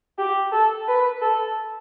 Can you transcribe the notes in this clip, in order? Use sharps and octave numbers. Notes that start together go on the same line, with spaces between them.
G4
A4
B4
A4